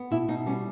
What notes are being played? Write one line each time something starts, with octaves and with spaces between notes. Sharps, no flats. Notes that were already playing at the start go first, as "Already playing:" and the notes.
Already playing: B3
B2 E4
B2 D#4
G3 C#4